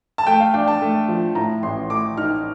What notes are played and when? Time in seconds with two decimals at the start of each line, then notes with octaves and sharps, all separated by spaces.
0.18 A5
0.27 A3 G5
0.40 F5
0.54 D4 G5
0.68 A5
0.81 A3
1.09 F3
1.35 A2 A#5
1.63 A1 C6
1.90 A3 D6
2.17 D#4 F6